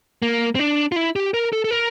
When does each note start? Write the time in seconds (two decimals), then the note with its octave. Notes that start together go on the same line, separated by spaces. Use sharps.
0.22 A#3
0.55 C4
0.59 D4
0.92 F4
0.96 E4
1.16 G4
1.34 A#4
1.53 A4
1.64 A4
1.71 A#4